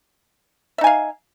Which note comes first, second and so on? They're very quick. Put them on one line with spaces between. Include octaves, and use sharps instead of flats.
E5 D#4 G#5 F5